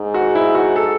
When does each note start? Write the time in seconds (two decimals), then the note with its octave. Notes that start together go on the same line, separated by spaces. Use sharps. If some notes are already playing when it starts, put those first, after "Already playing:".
Already playing: G#2
0.14 F#4
0.35 E4
0.55 F#4
0.76 A4